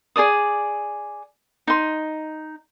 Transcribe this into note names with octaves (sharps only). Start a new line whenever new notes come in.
G#4 A4 D5 D#6
D#4 C6